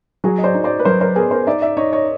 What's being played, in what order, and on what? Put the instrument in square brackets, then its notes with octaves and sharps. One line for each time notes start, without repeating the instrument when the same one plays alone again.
[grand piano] F#3 [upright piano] F#4 G#4
[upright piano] D#5
C5 D5
[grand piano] D#4
[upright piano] C5 D5
B4
[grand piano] F#3 [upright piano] A#4 C5
[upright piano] A#4 C5
[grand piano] B3 [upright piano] G#4 A#4
[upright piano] A#4 C5
[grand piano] D#4 [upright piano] D5 E5
[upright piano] D5 E5
[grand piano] D#4 [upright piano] C#5 D#5
[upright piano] C#5 D#5